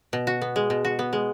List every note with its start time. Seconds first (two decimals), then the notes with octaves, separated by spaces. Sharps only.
0.13 B2
0.27 F#4
0.42 B3
0.56 G#3
0.70 B2
0.85 F#4
0.99 B3
1.13 G#3